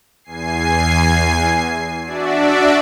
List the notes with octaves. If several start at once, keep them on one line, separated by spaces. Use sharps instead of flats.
E2 G#5 C7
D4 F#4 D5 E5